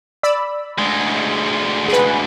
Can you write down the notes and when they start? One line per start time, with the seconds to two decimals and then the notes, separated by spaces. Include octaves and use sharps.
0.23 D5 B5 E6
0.78 D2 G#3
1.88 G#4 B4